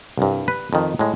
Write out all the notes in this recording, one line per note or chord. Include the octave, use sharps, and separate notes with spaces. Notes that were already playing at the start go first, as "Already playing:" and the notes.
C2 G2
B4
F2 D#3
A2 G#3